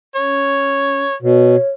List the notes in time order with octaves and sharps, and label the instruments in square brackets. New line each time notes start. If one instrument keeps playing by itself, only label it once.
[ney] C#4 [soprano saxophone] C#5
[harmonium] B2 [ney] C#5